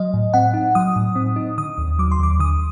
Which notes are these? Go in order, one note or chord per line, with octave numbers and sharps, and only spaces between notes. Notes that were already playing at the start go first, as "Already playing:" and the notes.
Already playing: F#3 D#5
A2
C4 F#5
D#4
F#3 D#6
A2
C4
D#4
D3 D#6
D#2
F#3 D6
C6
D#2 D6
D3 D#6